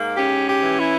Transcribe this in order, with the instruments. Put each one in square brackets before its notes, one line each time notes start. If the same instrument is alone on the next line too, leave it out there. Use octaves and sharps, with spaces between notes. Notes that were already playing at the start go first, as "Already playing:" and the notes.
Already playing: [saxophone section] G#2 A#3
[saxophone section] C#4 [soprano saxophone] G4
[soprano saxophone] G4
[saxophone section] E3
[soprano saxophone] E4